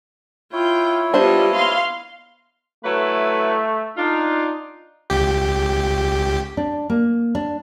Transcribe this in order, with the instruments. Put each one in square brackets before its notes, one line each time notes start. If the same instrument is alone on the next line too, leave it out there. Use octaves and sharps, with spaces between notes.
[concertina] E4 C#5 [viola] F4 G5
[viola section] G3 F4 [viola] B3 D#5 [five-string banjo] D4 C5
[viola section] F5 C6
[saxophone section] F#3 E4 B4 [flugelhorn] A3
[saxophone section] D4 F4 [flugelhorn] D#4
[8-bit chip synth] C#2 G4
[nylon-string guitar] D4
A#3
D4